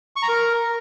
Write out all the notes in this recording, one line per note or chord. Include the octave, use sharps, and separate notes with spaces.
C#6
A#5
A#4